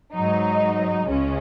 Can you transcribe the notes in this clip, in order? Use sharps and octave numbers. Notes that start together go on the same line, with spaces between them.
G#2 F#3 D#4
C#2 C#3 G#3 C#4